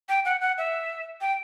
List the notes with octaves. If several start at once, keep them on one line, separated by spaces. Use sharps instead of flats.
G5
F#5
F#5
E5
G5